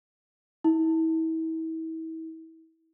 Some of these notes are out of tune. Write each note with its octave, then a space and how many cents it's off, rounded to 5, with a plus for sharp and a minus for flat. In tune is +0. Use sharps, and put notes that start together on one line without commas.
E4 -35